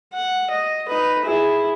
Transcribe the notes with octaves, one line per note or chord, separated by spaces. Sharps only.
F#5
D#5
D#4 B4
E4 G#4